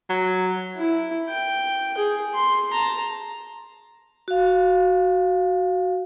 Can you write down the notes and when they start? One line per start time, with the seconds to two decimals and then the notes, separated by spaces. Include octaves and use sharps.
0.10 F#3
0.77 E4
1.29 G5
1.97 G#4
2.34 C6
2.73 A5 A#5
4.28 F#4 F5